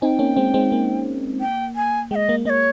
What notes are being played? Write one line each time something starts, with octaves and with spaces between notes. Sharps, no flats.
C4 D#4 G5 G#5
A#3 C#4
G#3 C4
G#3 C4
A#3
G5
G#5
G#3 D#5 G5
A#3
A#3 C#5 D#5